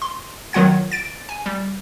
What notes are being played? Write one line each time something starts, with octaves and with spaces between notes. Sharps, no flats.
C6
D#3 F#3 F4 F#5 G#6
A6 D7
G#5
G3